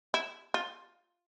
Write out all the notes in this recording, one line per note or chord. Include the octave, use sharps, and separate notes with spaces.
E4
F4